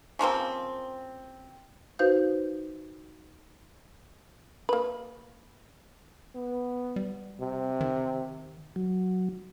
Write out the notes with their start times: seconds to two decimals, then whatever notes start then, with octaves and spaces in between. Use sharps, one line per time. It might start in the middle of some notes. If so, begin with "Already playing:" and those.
0.19 C#3 F3 A#3 C4
1.99 D#4 F#4 B4 C5 F5 G6
4.69 A#3 B4
6.35 B3
6.96 G3
7.40 C3
7.81 D#3
8.76 F#3